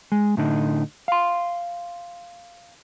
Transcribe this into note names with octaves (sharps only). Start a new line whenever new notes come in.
G#3
A2 D3 D#4
F5 C6